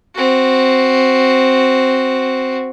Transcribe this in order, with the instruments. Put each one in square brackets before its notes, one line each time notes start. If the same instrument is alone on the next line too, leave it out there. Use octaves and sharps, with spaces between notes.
[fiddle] C4 F#4